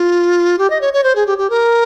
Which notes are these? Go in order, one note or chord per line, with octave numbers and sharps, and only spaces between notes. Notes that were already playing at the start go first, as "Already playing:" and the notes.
Already playing: F4
G4
D#5
C#5
C#5
C5
G#4
G4
G4
A#4